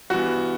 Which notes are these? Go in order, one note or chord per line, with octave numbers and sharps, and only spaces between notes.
G2 E3 B3 F#4